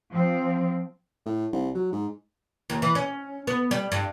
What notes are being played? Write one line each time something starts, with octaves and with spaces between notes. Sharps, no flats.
F3 C4
A2
C2
F#3
G#2
D#2
E3
C#4
B3
G3
G2